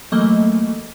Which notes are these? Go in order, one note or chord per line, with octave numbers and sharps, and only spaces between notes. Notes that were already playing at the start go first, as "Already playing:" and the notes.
E3 F#3 A3 A#3 D#5